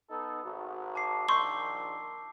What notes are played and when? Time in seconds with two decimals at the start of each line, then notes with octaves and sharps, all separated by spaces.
0.10 B3 D#4 A4
0.43 G#1 F#4
0.95 A5 D6 C7
1.29 A#1 A#2 D#3 C6 C#6 E6 G6 C7